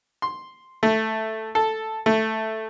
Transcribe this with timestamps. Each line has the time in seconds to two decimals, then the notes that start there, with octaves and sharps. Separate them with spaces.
0.22 C6
0.83 A3
1.55 A4
2.06 A3